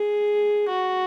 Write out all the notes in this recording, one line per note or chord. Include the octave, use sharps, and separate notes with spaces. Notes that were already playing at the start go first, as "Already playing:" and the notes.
Already playing: G#4
F#4